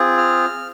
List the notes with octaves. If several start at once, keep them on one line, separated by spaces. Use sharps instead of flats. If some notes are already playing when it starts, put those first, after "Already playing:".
Already playing: C4 F4 G#4
F6